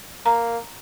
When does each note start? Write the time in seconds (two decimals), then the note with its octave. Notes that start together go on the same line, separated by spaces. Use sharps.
0.26 A#3 A#5